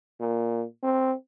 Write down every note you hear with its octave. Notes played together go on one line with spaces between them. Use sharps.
A#2
C4